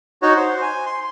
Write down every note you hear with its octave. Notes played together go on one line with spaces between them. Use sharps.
D#4 F#4 C#5
C5
G#5
C6